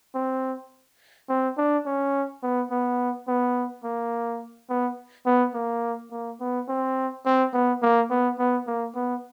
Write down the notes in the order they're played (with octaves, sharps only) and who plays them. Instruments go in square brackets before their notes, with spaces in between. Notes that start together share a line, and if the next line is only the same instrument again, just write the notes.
[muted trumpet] C4
C4
D4
C#4
B3
B3
B3
A#3
B3
B3
A#3
A#3
B3
C4
C4
B3
A#3
B3
B3
A#3
B3